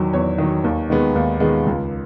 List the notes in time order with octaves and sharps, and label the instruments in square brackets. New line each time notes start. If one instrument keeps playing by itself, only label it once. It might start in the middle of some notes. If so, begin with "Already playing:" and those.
Already playing: [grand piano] E2 D#3 F#3
E2 C#5
D#3 F#3
D#2
D#3 G#3 B3
D#2
D#3 G#3 B3
C#2